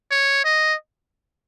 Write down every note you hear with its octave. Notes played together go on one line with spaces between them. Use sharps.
C#5
D#5